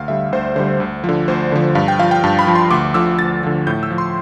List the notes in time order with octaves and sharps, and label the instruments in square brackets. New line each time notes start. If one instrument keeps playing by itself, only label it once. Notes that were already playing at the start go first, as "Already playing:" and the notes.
Already playing: [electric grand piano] D2 F5
D3 G3 E5
D2 C5
D3 G3 C5
D2
D3 F3
D2 C5
D3 F3
G2 F5
G5
F3 F5
G5
G2 A5
B5
F3
C6
D2 D6
D3 F3 E6
D2 A6
D3 F3
A2 G6
E6
F3
C6